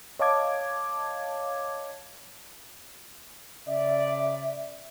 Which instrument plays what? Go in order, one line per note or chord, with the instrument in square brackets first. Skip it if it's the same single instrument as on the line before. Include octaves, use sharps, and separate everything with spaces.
[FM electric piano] C#5 D#5 F5 A5 D6 G#6
[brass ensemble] C#3 D5 [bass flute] E5